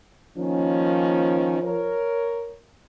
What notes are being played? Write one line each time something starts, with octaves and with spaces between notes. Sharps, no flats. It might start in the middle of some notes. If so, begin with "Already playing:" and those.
D#3 F3 A#3 C#4
A#4 C#5